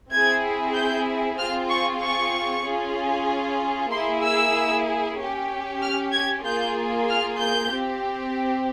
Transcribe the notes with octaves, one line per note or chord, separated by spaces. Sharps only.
C4 E4 G#4 G#6
G6
C4 F4 G#4 F6
C#6
C#6
C#4 F4 G#4
A#3 E4 G#4 C6
E6
C#4 G4
F6
G#6
A#3 F4 G#4 G6
F6
G6
C4 G4